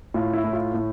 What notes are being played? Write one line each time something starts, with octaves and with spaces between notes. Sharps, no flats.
A2 F4
E4
A2
F4
A2